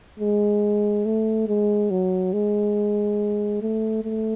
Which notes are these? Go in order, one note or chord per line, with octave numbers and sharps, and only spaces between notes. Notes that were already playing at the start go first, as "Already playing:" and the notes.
G#3
A3
G#3
F#3
G#3
A3
A3